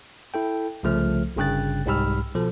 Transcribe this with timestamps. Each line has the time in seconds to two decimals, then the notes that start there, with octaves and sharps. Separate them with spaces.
0.34 E4 A4 G5
0.83 C2 C#3 F3 A3 F6
1.36 G1 G2 C#3 G5 F#6 A6
1.86 C2 G#2 G4 B5 E6 F6
2.35 B2 F3 A4